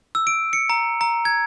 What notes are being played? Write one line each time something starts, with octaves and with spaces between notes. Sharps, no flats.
E6
D7
C#7
A#5
A#5
G#6